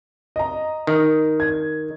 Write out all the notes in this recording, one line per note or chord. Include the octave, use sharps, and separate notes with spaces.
D#5 A#5
D#3
G#6